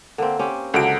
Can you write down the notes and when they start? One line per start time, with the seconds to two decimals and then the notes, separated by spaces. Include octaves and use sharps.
0.18 D3 A#3 C4
0.39 C4 C#4 G4
0.74 C#2 D3 F#3 D4 D7